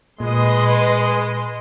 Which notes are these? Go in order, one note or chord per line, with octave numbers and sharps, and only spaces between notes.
A#2 G#3 B4 D#5 C6